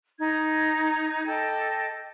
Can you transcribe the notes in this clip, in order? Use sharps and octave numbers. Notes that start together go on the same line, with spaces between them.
D#4 G#6
A4 D#5 G5 D6